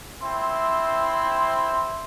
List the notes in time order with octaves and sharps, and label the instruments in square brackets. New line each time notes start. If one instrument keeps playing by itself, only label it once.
[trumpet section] C4 E4 C6